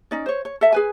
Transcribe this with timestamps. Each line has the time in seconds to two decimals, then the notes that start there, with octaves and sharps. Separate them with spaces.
0.11 C#4 D#4 D5
0.26 C5 C#5
0.45 C#5
0.61 A4 E5
0.72 G#4 B4 G#5